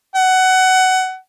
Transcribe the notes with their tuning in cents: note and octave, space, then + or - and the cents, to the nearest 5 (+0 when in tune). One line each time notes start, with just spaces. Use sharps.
F#5 +20